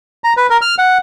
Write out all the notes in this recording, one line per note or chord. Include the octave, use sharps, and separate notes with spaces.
A#5
B4
A#4
F6
F#5